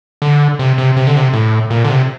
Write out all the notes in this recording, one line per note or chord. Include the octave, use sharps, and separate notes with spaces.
D3
C3
C3
C3
D3
C3
A2
A#2
D3
C3